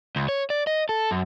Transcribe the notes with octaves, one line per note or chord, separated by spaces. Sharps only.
C#2
C#5
D5
D#5
A4
F#2